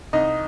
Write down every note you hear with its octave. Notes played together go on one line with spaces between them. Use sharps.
C2 D#4 D#5